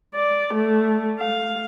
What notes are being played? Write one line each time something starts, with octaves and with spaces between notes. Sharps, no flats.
D5
A3
F5